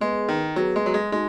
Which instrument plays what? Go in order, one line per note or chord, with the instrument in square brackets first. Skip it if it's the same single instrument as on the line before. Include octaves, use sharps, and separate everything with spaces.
[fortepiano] G#3 [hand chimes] B3 G#4 B4
[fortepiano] D#3
[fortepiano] F#3 [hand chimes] B3 G#4 B4
[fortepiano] G#3
F#3
G#3
[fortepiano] G#3 [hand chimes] D#4 F#4